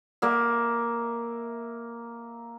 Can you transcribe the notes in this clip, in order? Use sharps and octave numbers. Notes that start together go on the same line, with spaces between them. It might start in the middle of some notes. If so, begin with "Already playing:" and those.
A#3 E5